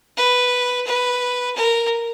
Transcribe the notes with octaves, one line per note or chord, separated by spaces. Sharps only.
B4
B4
A#4